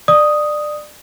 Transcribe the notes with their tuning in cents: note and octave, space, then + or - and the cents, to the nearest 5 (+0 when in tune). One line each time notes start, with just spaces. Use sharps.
D5 +20 D#6 +0